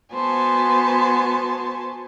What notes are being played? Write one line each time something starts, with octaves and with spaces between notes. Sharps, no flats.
B3 F#4 C5 G#5 A5